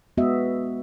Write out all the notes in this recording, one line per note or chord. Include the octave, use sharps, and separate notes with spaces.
G#3 B3 F#4 D#5 E5